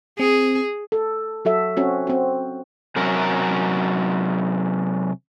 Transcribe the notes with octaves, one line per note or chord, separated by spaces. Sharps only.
C4 G#4
A4
F#3 F#4 A4 E5
C4 C#4 F#4
C4 F#4
C3 F#3 C#4 A#4